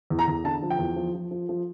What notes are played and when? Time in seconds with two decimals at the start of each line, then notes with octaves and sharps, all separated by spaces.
0.10 E2
0.19 A#5
0.28 E2
0.44 D3 A5
0.62 F3
0.70 G5
0.79 E2
0.96 F3
1.14 F3
1.31 F3
1.49 F3